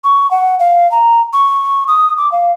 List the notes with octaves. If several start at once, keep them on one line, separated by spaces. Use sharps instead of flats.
C#6
F#5
F5
A#5
C#6
D#6
D6
F5